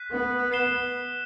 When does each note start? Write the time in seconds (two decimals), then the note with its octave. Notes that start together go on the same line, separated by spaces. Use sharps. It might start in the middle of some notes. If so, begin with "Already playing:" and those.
Already playing: F#6 B6 D#7
0.11 B3
0.52 F#6 C7 E7 G7